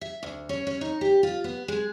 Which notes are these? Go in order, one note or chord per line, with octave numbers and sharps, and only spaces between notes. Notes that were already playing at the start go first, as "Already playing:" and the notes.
E5
D2
C#4
C#4
D#4
G4
F4
B3
G#3